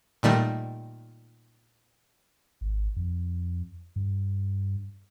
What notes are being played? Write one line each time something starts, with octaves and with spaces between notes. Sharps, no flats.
A#2 D#3 G3 A3
G#1
F2
G2